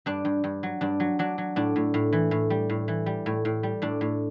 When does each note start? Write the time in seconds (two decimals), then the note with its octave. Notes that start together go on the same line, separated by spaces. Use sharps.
0.06 G2 D4
0.25 G2
0.44 G2
0.63 F#3
0.81 G2 D4
1.00 F#3
1.19 F#3 D4
1.38 F#3
1.56 A2 D4
1.76 A2
1.94 A2
2.13 E3
2.31 A2
2.50 G3
2.70 A2
2.88 E3
3.06 G3
3.26 A2
3.45 A2
3.63 G3
3.82 A2 D4
4.01 A2